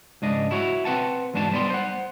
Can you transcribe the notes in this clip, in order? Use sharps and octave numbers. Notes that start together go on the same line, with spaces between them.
C#2 G#2 D4 D#5
E4 F#4 C#5
C4 B4 F#5 A5
E2 G#2 D4 F#4 A5
G3 B3 B4 D5 C6
C5 F#5